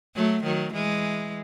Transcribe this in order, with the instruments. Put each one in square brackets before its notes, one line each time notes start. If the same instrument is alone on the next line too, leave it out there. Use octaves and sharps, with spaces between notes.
[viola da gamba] F#3 A3
D#3 F#3
E3 G#3